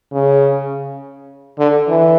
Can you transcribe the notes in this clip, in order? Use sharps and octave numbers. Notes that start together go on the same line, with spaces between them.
C#3
D3
E3